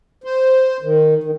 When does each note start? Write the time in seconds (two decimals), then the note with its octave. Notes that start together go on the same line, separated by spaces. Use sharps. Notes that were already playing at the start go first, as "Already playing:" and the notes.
0.24 C5
0.82 D#3
1.23 D#3